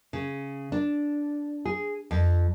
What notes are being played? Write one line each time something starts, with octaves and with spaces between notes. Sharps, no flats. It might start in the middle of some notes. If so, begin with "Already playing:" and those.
C#3
D4
G#4
F2